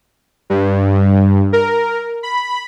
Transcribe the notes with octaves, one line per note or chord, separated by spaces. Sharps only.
G2
A#4
B5